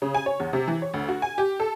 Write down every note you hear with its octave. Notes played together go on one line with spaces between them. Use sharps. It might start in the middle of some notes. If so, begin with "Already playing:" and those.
C#3
G#5
C#5
E2
C3
E3
C#5
D2
F#4
G#5
G4
A4